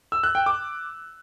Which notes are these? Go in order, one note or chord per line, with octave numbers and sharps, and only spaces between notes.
E6
F#6
G5
D6